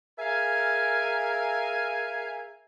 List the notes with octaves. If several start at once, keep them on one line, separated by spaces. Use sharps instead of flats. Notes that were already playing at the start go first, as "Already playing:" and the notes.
G#4 A#4 E5 F5 G#5